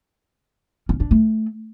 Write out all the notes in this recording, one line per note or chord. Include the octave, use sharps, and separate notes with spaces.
C#4
D4
A3